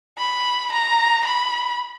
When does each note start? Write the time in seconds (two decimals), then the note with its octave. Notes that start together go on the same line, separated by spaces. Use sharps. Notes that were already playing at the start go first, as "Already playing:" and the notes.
0.18 B5
0.72 A#5
1.25 B5